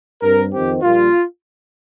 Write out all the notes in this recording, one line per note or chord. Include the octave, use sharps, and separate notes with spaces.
G2 G3 C4 A#4
F2 D#3 C4 G4
A#1 A#2 G3 A#3 F4